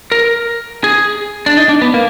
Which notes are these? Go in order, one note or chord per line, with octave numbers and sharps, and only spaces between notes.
A#4
G#4
D4
D#4
D4
B3
A#3